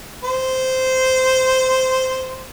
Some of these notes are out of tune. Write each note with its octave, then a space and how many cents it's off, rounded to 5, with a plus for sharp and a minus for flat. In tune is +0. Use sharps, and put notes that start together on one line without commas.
C5 -10